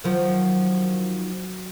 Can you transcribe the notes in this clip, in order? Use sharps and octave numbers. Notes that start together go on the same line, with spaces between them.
D#3 F3 F#3